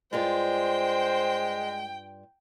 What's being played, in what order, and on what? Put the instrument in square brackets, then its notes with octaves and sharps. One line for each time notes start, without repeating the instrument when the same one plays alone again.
[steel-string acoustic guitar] G2 F4 D5 [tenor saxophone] G#3 [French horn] C5 [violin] G5